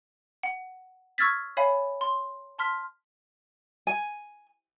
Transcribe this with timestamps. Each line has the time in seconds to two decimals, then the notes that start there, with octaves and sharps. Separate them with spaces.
0.43 F#5
1.18 C#6 E6 F6 G#6 A6 B6
1.57 C#5 E5 F5 G#5 B5
2.01 C6
2.58 A5 C6 F6 B6
3.87 G#5